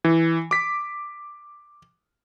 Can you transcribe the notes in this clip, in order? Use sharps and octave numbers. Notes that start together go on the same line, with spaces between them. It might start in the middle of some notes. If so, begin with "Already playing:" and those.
E3
D6 B6